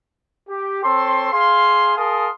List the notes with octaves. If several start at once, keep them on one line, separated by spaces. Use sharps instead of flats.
G4
C4 A4 C#5 C6
G#4 F5 C6
G#4 A#4 F5 A5 C6 D#6